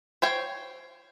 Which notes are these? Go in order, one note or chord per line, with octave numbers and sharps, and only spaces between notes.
C5 C#5 G5